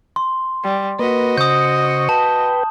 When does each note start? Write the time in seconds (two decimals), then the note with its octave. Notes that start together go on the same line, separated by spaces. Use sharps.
0.16 C6
0.64 G3
0.99 A#3 F#4 B4 D#5
1.38 C#3 C5 C#6 D#6 G6
2.09 B4 G5 A5